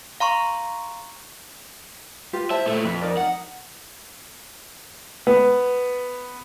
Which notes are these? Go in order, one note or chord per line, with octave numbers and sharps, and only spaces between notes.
F5 A#5 C6 C#6
F4 G4 B4
E4 C5 E5 A5
A#2 A3
F2 B4
D#4 A#4 D5
D#4 F#5
B3